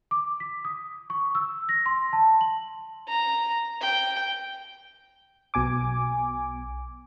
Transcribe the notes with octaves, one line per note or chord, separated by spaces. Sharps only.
D6
B6
D#6
C#6
E6
A#6
C6
A5
F#7
A#5
G5
B1 B2 G#5 D6